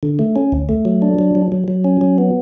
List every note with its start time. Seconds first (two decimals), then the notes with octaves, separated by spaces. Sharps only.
0.03 D3
0.19 A3
0.36 C#4
0.52 D2
0.69 A3
0.85 F#3
1.02 D4
1.19 F#3
1.35 F#3
1.52 F#3
1.68 F#3
1.84 C#4
2.01 F#3
2.18 B3